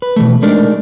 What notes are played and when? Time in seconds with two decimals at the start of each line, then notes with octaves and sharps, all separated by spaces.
0.02 B4
0.16 B2 E3 A3
0.42 G#3 A3 D4 D#4 A#4 D5